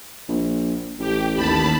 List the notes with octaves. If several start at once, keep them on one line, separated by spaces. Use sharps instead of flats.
A#1
A1 G4
D#2 A5 B5